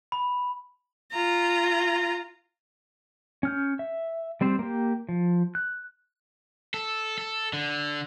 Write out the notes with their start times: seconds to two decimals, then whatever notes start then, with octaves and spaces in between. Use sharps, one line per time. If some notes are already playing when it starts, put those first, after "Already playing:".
0.12 B5
1.13 F4 A#5
3.43 C#4 F6 G6
3.79 E5
4.41 G3 C4 C5
4.59 A#3 G4
5.09 F3
5.55 F#6
6.74 A4
7.18 A4
7.53 D3